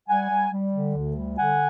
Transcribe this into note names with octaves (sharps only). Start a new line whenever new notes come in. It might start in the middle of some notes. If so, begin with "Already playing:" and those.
G3 F#5 G#5
G3
G3
D3
D2
G3
D3 F#5 G#5